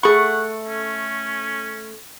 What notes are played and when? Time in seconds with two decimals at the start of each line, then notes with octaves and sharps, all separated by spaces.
0.03 A3 G#4 F#5 B5 C#6
0.68 C#4